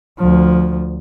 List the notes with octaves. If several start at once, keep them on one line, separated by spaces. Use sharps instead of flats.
D2 F3